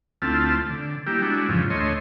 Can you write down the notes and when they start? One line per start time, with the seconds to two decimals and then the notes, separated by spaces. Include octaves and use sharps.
0.22 D2 A3 C4 E4 F4 A5
0.70 D3
1.06 G3 A#3 E4 G4
1.22 G#3 D4 E4 F#4
1.49 F2 G#2 C#3 E3 F3
1.70 D2 A3 C#5 D#5 C6